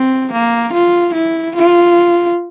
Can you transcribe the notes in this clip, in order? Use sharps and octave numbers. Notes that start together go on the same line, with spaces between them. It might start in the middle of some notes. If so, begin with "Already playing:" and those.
Already playing: C4
A#3
F4
E4
F4